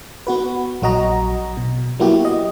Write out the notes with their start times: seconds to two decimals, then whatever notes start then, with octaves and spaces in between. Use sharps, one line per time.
0.27 B3 F#4 B4
0.82 A#1 F#3 F#4 D#5 A#5
1.57 B2
2.00 F#3 A#3 B3 E4 F#4 G4
2.25 D#5